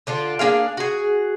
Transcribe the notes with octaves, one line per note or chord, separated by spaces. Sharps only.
D3 D4 F4
A#3 D4 G#4 F5
F#4 G#4